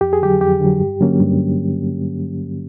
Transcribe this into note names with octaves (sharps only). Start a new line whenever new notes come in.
F2 G4
G#4
D3 F#3 G4
F2 G4
D3 F#3
G2
D3 F#3 A#3 C#4
G2